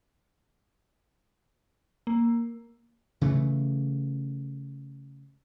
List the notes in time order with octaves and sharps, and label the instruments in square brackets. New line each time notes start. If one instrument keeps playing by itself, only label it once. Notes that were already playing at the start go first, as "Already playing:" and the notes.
[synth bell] A#3
[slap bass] C#3 E3 A3